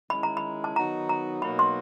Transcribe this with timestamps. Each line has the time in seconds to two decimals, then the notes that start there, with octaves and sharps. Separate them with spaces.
0.10 D#3 G#3 C#4 E4 B5
0.23 A#5
0.37 B5
0.64 A5
0.76 D#3 F#3 B3 D#4 F#4 A#5
1.09 A#5
1.42 B2 F#3 A#3 D#4 F#4 B5
1.59 C6